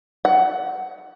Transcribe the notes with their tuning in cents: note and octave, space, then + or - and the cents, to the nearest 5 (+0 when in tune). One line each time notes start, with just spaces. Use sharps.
F#5 +15